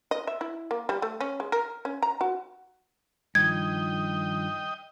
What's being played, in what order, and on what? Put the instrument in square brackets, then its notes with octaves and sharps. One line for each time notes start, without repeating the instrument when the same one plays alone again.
[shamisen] D#5
E5
E4
A#3
G3
A3
C#4
G#3
A#4
C#4
A#5
F#4
[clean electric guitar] G2 D#3 F3 [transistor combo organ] D#5 G5 [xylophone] G#6